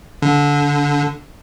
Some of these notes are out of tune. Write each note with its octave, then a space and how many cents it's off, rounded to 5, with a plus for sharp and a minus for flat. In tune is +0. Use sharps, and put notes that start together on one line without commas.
D3 -20